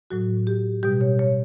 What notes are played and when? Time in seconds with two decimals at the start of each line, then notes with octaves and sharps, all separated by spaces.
0.10 A2 F#3 F#4
0.47 G4
0.83 B2 G3 G4
1.01 C#5
1.19 C#5